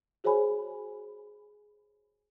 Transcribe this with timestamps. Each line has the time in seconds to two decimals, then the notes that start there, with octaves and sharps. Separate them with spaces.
0.24 F#4 G#4 C5 C#5 G#5 B5